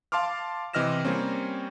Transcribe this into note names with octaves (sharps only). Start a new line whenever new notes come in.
F5 A5 C6 D6 F6
C3 E3 D#5 F6 A#6 E7
G3 A#3 C4 C#4